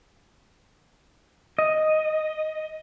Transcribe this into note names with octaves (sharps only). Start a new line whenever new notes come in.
D#5